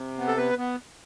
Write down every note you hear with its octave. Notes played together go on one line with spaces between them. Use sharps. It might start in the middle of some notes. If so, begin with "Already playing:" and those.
Already playing: C3
B3
A4
B3 B4
B3